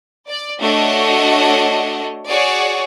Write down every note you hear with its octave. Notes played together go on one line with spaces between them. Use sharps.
D5
A3 D4 F#4 C#5 D#5
F#4 G#4 C#5 D5